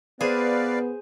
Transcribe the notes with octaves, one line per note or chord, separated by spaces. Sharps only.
B3 G#4 B4 C5 D5 F5